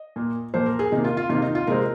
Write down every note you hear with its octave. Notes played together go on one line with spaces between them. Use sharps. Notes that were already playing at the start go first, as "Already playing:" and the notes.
Already playing: D#5
A#2 A#3
A#2 F3 A#3 C5
A#4
G#4
C3 D#3 A#3 D#4
F4
F4
C3 D#3 A#3 F4
D#4
F4
C3 G#3 C4 A#4